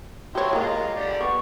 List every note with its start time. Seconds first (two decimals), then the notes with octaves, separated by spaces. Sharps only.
0.35 F#3 E4 G4 C#5 C6
0.53 G#3 A#3 F4 A#4
0.96 D3 G4 D5
1.21 B3 C#6